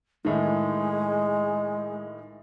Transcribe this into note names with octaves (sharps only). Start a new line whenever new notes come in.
A2 D#3 G#3